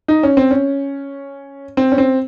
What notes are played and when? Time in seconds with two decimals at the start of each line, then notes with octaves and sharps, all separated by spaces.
0.08 D#4
0.23 C#4
0.37 C4
0.51 C#4
1.77 C4
1.92 C#4
1.98 C4